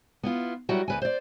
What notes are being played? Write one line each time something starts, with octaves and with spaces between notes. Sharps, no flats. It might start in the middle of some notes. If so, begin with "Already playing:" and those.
B3 E4 F4
F#3 G3 E4 F#4 B4
D2 B4 G#5
C5 D5